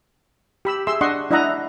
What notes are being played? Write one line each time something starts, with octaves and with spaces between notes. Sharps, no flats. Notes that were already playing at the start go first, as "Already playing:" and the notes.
G4 B5 E6
G#4 E5 C6 E6
D4 D#5 F#5 C6 C#6
D4 E4 D#5 E5 F#5 A#5